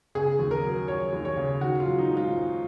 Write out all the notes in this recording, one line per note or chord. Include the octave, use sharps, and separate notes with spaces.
C#3 G#4
D#2
A#4
F#3
F#3 C#5
D#2
C#5
C#3
D#3 F#4
F4
F#3
D#4
G#2
F4
G#2